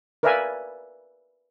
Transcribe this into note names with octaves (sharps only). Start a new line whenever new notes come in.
A#4 B4 D5 E5 F5 G#5